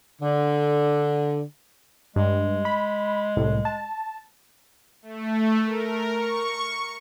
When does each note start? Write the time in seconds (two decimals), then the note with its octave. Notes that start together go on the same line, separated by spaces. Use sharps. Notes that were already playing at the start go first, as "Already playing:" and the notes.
0.21 D3
2.16 G2 G#3
2.65 B5
3.37 C2 A2
3.65 A5
5.02 A3
5.65 A#4
6.12 C#6